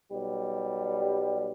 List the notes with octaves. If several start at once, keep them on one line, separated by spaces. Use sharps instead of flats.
B1 G3